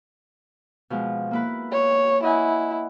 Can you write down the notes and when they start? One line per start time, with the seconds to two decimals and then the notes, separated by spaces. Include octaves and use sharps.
0.90 B2 F3 G#3
1.31 A#3 E4 B4
1.72 C#5
2.23 E4 D#5 F#5 G#5